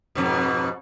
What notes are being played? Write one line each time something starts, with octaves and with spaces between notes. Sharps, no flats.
F2 G#2 B2